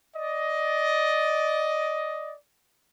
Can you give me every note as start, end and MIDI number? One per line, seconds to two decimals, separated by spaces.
0.14 2.33 74
0.14 2.33 75